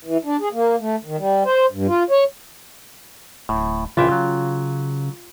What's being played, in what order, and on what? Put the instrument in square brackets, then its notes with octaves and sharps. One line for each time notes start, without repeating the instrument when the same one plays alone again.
[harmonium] E3
D4
G#4
A#3
A3
D#3
G3
C5
G2
F4
C#5
[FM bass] D1 [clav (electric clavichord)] A2
[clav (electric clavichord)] A#1 E3 E5 [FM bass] C#3 [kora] F4 G5
[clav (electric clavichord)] F#3